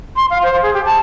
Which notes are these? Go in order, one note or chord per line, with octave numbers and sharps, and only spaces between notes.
C6
F5
C5
G#4
G4
A5